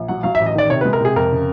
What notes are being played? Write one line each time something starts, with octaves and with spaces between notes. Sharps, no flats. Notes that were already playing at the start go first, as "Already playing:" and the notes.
Already playing: A#1
F#3 F#5
F#3 F5
E5
A1
D#5
D#3 D5
C3 C#5
B4
G#3
A#4
C3 G#4
F2 A#4
C#3